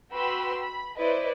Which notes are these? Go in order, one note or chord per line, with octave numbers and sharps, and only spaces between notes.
F#4 B4 G5 B5 C6 E6
B5
E4 B4 C5 D5 D#5